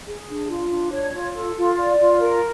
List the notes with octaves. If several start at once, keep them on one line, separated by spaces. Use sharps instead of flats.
G#4
D4
F4
D4
C#5
F4
A4
F4
D5
F4
A#4